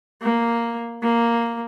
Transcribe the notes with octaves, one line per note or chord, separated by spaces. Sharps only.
A#3
A#3